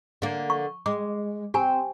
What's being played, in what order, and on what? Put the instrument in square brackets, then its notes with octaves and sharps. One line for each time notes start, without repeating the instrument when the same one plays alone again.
[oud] D3 A#3
[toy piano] C#6
[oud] G#3 [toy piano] D6
[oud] C4 [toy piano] G4 G#5